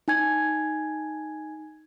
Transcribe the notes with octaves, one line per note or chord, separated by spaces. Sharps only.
D#4 G#5 G#6